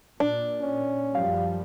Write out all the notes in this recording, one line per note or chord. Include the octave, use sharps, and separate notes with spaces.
A#2 D4
C#4
F#2 F3 G3 F5